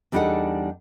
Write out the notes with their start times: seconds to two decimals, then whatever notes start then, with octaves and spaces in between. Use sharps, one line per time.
0.12 E2 G3 D4 D#4 A4 F#5